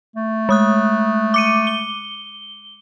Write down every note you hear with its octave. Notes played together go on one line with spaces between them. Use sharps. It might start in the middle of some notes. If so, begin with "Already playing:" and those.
A3
G#3 D#6 F#6
D6 C#7 D#7
G7